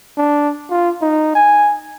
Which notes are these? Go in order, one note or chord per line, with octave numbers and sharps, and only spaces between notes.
D4
F4
D#4
G#5